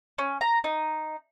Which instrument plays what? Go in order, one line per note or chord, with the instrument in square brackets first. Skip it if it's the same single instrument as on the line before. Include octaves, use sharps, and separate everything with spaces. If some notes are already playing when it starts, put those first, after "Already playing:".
[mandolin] C#4
A#5
D#4